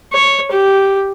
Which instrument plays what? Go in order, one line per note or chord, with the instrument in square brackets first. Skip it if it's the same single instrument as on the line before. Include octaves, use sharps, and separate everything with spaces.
[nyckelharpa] C#5
G4